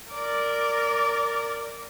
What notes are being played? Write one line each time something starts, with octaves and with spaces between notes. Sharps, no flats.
A#4 D5